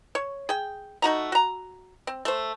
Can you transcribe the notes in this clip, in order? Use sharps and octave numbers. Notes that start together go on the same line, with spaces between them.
C#5
G#4 G5
A3 D#4 F#4 A#5
F#4 A#5
C4
A3 C5